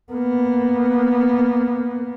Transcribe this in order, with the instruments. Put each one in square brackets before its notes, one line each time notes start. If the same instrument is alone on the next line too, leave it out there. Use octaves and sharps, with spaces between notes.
[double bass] A#3 B3